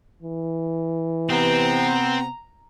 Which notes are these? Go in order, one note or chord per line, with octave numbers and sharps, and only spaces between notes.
E3
C3 B3 C4 A#5